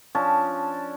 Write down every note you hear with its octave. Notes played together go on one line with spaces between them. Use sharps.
F3 C#4 D4 A5